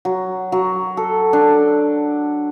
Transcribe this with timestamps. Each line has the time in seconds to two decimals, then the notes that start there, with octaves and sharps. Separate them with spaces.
0.05 F#3
0.52 F#3
0.97 A4
1.33 D4